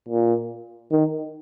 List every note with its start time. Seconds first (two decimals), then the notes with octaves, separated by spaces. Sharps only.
0.09 A#2
0.91 D#3